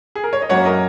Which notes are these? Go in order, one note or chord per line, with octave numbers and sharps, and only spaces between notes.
G#4
A#4
C#5
D#5
F#2 F#3 A#3 C#5 F#5
A#4 D#5